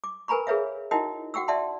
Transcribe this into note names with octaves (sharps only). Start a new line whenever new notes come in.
D6
A#4 B4 G#5 A#5 B5 C#6
G#4 A#4 B4 C#5 E5 F5
D#4 E4 F#4 A#4 D#5 G5
F#4 F#5 G5 C#6 E6
D5 E5 F#5 A5 C6